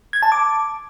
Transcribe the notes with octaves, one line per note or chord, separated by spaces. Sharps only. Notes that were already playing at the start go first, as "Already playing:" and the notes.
G#6
A5
D6